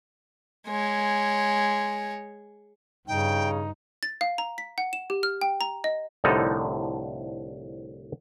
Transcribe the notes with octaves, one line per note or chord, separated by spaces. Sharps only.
G#3 C#5
G2 C#3 D#4 G5
A6
F5
A#5
B6
F#5
E7
G4
F6
G5
A#5
D#5
C2 A2 D3 F3 D#4 A4